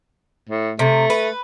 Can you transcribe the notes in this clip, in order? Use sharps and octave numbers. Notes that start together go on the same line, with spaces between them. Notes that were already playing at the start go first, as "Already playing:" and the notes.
A2
C3 A3
B4